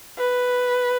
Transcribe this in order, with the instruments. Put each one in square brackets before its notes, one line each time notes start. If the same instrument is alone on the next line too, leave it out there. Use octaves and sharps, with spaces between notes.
[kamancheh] B4